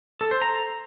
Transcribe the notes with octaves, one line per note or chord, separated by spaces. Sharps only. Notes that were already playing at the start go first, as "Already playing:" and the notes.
A4
C5
A#5